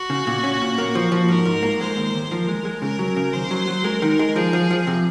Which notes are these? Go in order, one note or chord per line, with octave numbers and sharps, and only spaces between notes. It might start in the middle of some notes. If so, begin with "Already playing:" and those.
Already playing: F#4
C#3
A#2
C#4
A#2
A#3
F3
F3
G#2 A#4
G#2
A#3
G#3 C5
D#2
D#2
F3 A#4
G#3
G#3
C#3 A#4
F#3
C#3
D#2 C5
F#3
F#3
G#3 A#4
D#3
G#3
F3 G#4
F3
F3
C3